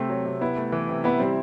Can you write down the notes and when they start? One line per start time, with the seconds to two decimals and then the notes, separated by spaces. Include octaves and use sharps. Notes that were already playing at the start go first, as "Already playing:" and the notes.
Already playing: C3 A3 C4
0.09 F#3
0.25 C3
0.41 B3 E4
0.57 A3
0.72 E3
0.89 C3
1.04 B3 E4
1.20 G3 C4